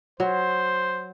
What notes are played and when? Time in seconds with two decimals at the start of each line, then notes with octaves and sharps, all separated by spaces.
0.20 F#3 C5